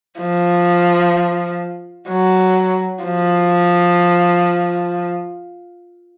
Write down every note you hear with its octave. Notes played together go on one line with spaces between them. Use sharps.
F3
F#3
F3